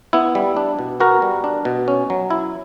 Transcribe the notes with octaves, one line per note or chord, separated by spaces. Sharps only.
B3 E4
G3
D4
B2
B3 F#4 A#4
G3
D4
B2
C#4
F#3
E4